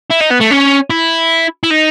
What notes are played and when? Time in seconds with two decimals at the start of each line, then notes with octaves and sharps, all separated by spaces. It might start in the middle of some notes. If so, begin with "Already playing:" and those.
0.10 E4
0.20 D#4
0.30 B3
0.40 A3
0.50 C#4
0.90 E4
1.63 E4
1.70 D#4